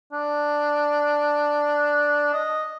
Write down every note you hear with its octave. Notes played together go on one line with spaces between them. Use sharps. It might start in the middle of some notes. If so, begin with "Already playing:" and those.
D4
D#5